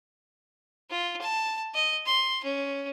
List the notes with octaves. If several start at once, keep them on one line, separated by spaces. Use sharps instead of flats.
F4
A5
D#5
C6
C#4